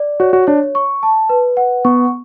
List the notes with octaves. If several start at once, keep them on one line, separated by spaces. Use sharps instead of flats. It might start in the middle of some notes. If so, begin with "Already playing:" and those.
Already playing: D5
F#4 C#5
F#4
D4 C#5
C#6
A5
B4
F#5
B3 C#6